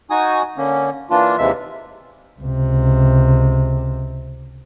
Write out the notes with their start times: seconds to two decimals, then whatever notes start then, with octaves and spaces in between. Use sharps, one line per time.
0.10 D#4 F#4 G#5 D#6
0.57 D3 A#3 C#4
1.10 E3 A#3 D4 F4
1.38 D#2 C3 E3 G#3 E5
2.41 C#2 C3